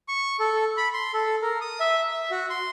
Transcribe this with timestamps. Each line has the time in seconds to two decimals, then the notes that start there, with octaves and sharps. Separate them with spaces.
0.08 C#6
0.40 A4
0.77 B5
0.93 C6
1.14 A4
1.42 A#4
1.61 D#6
1.80 E5
2.11 E5
2.31 F#4
2.50 C6